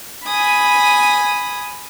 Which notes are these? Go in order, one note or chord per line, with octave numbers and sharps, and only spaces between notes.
G#5 B5 D#6